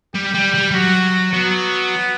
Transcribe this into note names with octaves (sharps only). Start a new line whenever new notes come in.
G3 G4
G3
G3
G3
F#3 F#4
F#3 B3